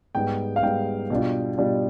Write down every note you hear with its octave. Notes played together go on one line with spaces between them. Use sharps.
G#2 G3 B3 G5
F5
G#2 G3 B3 G5
B2 G3 D4 F4
B2 G3 D4 F4